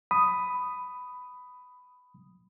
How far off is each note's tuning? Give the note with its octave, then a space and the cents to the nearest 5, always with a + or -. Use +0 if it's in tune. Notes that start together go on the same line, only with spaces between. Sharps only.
B5 +10 D#6 +0